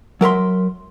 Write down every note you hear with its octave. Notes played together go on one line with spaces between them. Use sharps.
F#3 A#4 E5 C6